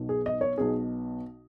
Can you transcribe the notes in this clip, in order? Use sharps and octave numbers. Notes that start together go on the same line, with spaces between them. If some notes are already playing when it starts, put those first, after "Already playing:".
Already playing: B1 B2
G#4
D#5
C#5
B1 B2 G#4